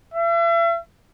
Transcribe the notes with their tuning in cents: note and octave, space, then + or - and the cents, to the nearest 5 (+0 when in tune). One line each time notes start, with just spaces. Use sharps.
E5 +40